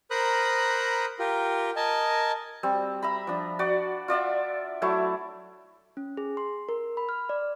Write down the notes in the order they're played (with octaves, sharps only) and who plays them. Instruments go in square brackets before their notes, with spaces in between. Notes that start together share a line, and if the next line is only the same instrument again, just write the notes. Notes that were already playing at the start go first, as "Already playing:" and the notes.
[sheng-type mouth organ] A#4 C5 A#5 B5 D#6 F#6
F4 G4 A#4
A#4 D#5 G#5 A5
[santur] G3 C4
E5 A#5 B5
F3 D4
F#4 D5
F4 D5 E5 F#5
F#3 A3 E4 A5
[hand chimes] C#4
G#4
C6
A#4
B5
F6
D5